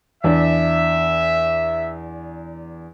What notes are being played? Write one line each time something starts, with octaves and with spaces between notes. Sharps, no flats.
E2 D4 E5